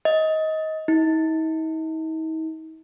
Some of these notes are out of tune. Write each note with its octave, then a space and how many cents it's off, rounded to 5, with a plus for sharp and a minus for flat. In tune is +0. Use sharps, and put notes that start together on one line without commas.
D#5 +20
D#4 +45